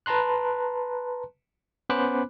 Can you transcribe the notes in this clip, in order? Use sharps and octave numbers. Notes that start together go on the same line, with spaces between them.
B4 A5 A#5 C6 F#6
B3 C#4 C5 B5 D6 F#6